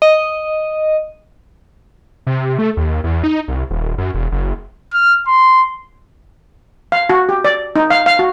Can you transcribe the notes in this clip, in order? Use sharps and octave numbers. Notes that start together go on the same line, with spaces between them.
D#5
C3
A3
D#2
E2
D#4
C2
D#1
F#2
E1
F#1
F6
C6
F5
F#4
G4
D5
D#4
F5
F5
F#4